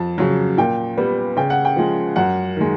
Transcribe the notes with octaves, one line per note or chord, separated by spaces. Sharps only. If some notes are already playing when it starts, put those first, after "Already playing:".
Already playing: F2 A5
C#3 F#3
A#2 G5
G3 B3
C#3 G5
F#5
G5
F3 G#3
F#2 F#5
D#3 G#3